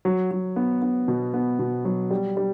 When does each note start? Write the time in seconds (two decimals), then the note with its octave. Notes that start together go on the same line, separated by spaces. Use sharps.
0.05 F#3
0.31 F#3
0.56 B3
0.82 B3
1.08 B2
1.34 B3
1.59 B2
1.85 F#3
2.10 G3
2.37 G3